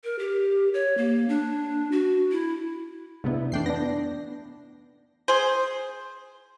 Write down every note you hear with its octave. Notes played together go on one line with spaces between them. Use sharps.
A#4
G4
C#5
A#3
D4
F#4
E4
G#2 C3 B3 D4 E4
F2 E3 A3 D4 G5 C7
B3 D4 A#6
G#4 C5